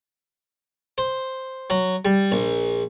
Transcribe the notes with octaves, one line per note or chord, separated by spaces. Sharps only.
C5
F#3
G3
A#1